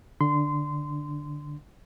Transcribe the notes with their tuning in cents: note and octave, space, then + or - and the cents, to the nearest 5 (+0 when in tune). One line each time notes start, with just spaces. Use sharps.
D3 +5 D4 +0 C6 -20